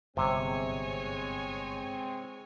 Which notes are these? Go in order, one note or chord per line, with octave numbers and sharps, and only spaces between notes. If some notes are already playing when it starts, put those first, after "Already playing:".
G1 C3 G#3 C4 C#5 G#5